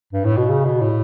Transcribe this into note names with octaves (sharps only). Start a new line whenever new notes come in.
G2
A2
B2
C#3
B2
A2